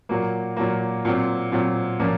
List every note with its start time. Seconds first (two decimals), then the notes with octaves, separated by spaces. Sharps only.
0.09 A#2 F#3 A#3
0.57 A#2 F#3 A#3
1.05 A#2 F#3 C4
1.52 A#2 F#3 C4
2.00 A#2 F3 A#3 C#4